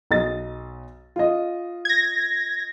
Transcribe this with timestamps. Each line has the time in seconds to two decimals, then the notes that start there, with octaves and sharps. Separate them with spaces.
0.11 B1 D#5 A6
1.16 F4 D#5
1.85 G#6 A#6